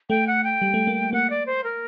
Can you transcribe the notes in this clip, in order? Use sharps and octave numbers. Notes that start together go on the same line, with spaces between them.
A3 G5
F#5
G5
G3
A3
A#3
A#3 F#5
D5
C5
A#4